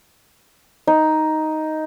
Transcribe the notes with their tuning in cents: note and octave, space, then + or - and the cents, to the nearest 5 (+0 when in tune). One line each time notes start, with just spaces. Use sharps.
D#4 +5